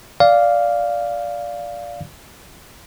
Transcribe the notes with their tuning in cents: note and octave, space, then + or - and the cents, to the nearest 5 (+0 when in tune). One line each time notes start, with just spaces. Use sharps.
D5 -10 F5 +0